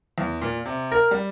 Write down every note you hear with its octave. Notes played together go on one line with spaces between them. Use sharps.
E2
A#2
C3
A#4
G3